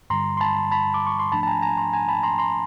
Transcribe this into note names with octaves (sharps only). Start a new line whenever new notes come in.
G2 D3 G3 A#5 C6
C6
A5 B5
A5 B5
D6
C#6
C6
G#2 F3 A3 D4 A5 B5
A5
G#5 A#5
G#5 A#5
A#5 C6
G#5 A#5
A5 B5
A#5 C6
A#5 C6